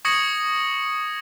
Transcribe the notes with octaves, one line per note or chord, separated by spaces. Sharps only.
C#6 D#6 G#6 A#6 C#7 F#7